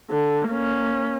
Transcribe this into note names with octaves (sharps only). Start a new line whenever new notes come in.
D3
A#3 C#4